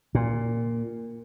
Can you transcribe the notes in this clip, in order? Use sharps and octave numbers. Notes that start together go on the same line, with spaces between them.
A#2